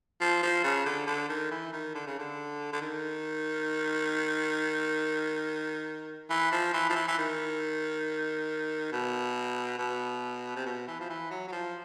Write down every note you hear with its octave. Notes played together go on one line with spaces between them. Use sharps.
F3
F3
C#3
D3
D3
D#3
E3
D#3
D3
C#3
D3
D3
D#3
E3
F3
E3
F3
E3
E3
D#3
B2
B2
C3
B2
E3
F3
E3
F#3
F#3
F3